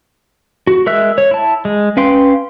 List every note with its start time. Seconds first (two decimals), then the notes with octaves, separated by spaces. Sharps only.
0.67 F#4
0.86 G#3 A#4 E5 E6 F#6
1.18 C#5
1.31 E4 A5
1.65 G#3
1.97 C#4 B4 F5 G5 C6